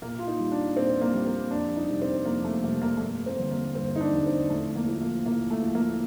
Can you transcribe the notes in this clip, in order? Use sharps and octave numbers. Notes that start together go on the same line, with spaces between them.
A#2 A#3
F4
D#4
G3
D4
A#2 C4
A#3
G3
A#3
F2 D4
D#4
C3 G3
C4
F2 A#3
A3
C3 G3 A#3
A#3
A3
G2 A#3
C4
D3 G3
A#3
G2 C4
D#4
D4
D3 G3
C4
A2 A3
A#3
F3
A#3
A2 A#3
A3
F3
A#3